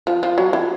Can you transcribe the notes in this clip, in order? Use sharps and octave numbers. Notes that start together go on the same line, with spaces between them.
F3
F3
F#3
E3